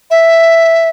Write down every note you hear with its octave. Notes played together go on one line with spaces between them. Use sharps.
E5